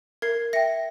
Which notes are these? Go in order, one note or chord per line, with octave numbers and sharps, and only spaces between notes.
A#4 G#6 C7
E5 G5 A#6 C#7